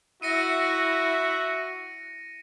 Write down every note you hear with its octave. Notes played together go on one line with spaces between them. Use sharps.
E4 F#4 E5 A#6 C#7 D#7